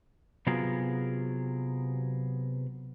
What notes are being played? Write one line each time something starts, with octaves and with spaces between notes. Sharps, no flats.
C3 F#3 B3 F4 G#4 A#4